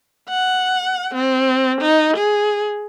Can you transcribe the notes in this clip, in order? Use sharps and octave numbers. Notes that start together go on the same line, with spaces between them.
F#5
C4
D#4
G#4